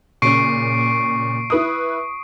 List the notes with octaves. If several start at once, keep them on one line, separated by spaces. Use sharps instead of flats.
A#2 C#3 C#4 C#6 C7 D7
E4 B4 D#6